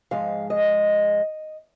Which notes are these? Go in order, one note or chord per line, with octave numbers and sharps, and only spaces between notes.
G#2 F3 G#3 F5
D#5